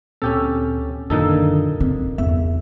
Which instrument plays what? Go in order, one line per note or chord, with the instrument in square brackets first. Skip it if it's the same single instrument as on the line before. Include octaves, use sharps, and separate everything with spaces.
[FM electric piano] D2 A#2 C4 [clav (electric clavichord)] C#4 G4 A4
[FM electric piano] F#2 D#3 D4 [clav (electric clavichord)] A#2 D#4 A4 [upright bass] D3
[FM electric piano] C#3 [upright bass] C4
[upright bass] E2 [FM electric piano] E5